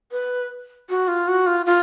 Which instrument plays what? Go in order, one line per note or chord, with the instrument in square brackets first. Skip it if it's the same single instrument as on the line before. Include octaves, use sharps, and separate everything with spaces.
[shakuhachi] B4
F#4
F4
F#4
F4
F4